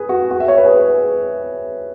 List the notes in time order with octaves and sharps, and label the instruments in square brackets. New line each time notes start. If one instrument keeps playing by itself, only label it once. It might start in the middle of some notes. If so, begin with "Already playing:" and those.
Already playing: [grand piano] G#4 B4
F#4
F#4
E5
C#5
B4
G#4